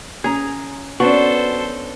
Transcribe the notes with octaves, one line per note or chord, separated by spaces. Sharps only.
C#4 G#4 A#5
B3 C#4 D4 F#4 A4 C5